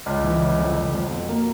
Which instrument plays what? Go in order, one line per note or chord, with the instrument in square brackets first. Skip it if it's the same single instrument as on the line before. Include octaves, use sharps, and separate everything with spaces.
[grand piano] C#2
E3
C#2
F2
F2
F2
B2
A#3